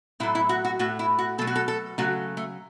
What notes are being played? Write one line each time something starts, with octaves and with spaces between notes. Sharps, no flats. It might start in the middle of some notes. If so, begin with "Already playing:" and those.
A2 F#3 A3 E4
E4
F#4
F#4
A2 A3 F#4
E4
F#4
B2 F#3 A3 A4
F#4
A4
A4
C#3 F#3 A3 F#4
A3